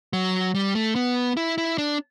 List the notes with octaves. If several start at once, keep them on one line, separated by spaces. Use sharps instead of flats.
F#3
G3
A3
B3
E4
E4
D4